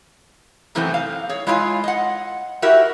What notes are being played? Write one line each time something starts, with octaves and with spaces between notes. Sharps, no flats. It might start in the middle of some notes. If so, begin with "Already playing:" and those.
F#2 C3 E3 A3 B3 C4
F5
G#4 C#5
G#3 E4 F4 G5 G#5
D#5 F#5
E4 F#4 G4 A#4 E5